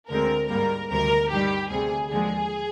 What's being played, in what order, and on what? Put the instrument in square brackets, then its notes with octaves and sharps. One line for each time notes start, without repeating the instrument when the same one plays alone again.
[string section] D2 D3 G#3 C4 A#4
G#2 G3 A#3 A#4
D2 C3 D#3 G3 A#4
G2 D#3 G3 G4
D2 C3 G3 G#4
D#2 D3 F3 G#3 G#4